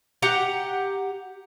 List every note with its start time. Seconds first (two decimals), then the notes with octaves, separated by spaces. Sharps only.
0.22 G4 F#5 G5 A#5